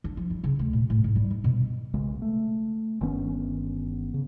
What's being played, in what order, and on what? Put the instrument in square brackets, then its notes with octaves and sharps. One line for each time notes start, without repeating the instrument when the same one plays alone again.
[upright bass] D4
F3
G2
C#3
D2
A#2
A2
G#2
G3
D4
B2
[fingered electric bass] B1 C#3 G#3
A3
G1 D#3 B3 C#4
C#3